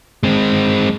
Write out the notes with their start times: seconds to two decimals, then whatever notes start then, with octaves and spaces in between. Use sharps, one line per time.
0.23 G#3 C4